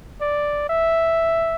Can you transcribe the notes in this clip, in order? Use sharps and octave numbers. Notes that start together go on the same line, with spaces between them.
D5
E5